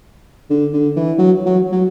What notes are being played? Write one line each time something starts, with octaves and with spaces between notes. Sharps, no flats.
D3
D3
E3
F#3
F#3
F#3